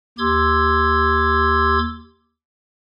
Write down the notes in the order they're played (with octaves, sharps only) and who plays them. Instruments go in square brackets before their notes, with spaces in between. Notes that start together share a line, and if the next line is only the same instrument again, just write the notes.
[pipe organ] D#2 G4 C6 D6 E6 G#6